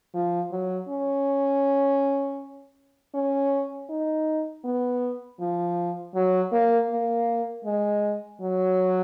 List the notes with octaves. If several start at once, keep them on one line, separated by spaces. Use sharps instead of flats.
F3
F#3
C#4
C#4
D#4
B3
F3
F#3
A#3
A#3
G#3
F#3